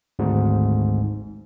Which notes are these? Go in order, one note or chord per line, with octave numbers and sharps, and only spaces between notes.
G#1 D2 G#2